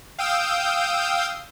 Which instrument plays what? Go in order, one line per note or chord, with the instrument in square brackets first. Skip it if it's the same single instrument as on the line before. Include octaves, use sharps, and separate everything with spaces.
[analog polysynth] F5 G5 D#6 E6 G6